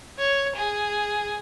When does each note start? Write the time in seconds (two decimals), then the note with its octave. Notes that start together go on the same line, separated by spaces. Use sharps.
0.19 C#5
0.56 G#4